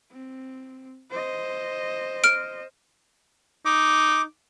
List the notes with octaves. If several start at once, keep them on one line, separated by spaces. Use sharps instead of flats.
C4
C5 D#5
F6 D7
D#4 D6